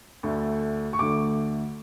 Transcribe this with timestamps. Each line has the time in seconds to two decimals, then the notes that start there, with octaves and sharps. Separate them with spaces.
0.23 D2 D3 A3
0.93 C#6
0.99 D2 D3 A3 D6